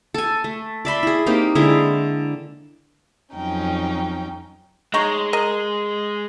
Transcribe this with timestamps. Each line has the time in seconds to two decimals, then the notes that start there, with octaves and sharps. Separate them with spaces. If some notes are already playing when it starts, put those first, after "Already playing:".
0.14 A4 G#5
0.44 A3
0.85 D5 E5 B5 C6
1.03 E4 G#4
1.26 A#3 C4 D#4 G4
1.55 D3 G#3 E4 G#4
3.33 F2 F#3 C#4 D#4 G5
4.94 G#3 D#4 C#5 A#5
5.33 A#4 D#5